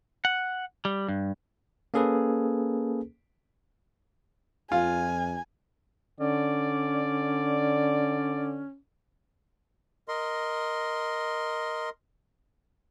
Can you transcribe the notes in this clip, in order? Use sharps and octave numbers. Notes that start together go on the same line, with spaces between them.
F#5
G3
G2
A#3 C#4 G#4 A4 B4
F2 F4 G#5
D3 C#4 D5
A#4 D#5 C6